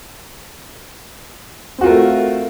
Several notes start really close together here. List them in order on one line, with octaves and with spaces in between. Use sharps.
C4 F#4 F4 A#4 A3